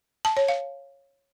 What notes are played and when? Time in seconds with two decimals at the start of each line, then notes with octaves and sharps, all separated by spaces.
0.25 A5
0.37 C#5
0.48 F5